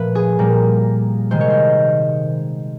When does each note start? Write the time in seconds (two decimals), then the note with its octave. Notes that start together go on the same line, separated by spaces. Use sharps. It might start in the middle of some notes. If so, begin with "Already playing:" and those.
Already playing: A#2 F3 A3 B4
0.15 G#4
0.39 A#2 G3 A#3
1.31 C3 D#3 G#3 C5
1.41 C#5
1.50 C5